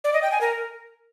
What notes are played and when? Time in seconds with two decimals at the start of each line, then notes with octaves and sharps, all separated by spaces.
0.04 D5
0.13 D#5
0.22 G5
0.31 G#5
0.41 A#4